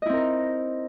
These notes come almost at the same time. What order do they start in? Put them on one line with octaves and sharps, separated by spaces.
D#5 E4 C4 A#4 D#4